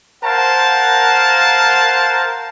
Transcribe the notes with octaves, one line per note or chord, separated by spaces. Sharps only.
A#4 C5 F5 F#5 A5